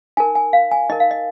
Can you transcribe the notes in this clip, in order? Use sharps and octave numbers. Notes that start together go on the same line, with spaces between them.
D#4 A#4 G#5
G#5
F5
G#5
D#4 A#4 D#5
F5
D#5